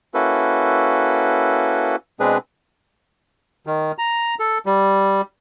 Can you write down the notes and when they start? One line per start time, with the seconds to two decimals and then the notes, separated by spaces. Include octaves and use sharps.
0.14 A#3 C#4 E4 F#4 A4 B4
2.20 B2 G#3 C4 D4 G#4 B4
3.67 D#3
3.98 A#5
4.40 A4
4.66 G3